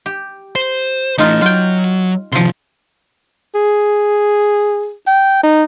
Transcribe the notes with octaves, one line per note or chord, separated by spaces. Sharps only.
G4
C5
E3 A3 D#4 F4
F#3 F4 G5
C3 D#3 F3 C6
G#4
G5
D#4